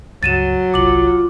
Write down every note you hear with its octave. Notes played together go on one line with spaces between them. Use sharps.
C#2 G2 F#3 A6 D#7 E7
G1 C2 F4 D6 A6 F#7